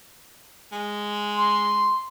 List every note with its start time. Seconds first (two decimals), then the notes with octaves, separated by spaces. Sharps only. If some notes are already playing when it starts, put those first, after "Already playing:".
0.72 G#3
1.38 C6